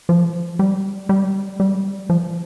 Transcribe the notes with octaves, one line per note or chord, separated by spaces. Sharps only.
F3
G3
G3
G3
F3